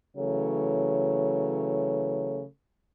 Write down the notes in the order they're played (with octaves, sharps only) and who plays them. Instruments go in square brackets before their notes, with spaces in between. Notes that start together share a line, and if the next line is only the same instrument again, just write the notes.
[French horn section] C#3 E3 F#3 A3